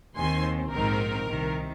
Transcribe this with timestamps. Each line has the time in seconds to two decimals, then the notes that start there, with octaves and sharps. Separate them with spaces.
0.16 D#2 D#3 C4 G#5 C6
0.73 A#1 G#2 D#3 C4 D#4 A#4
1.29 C2 C3 D#3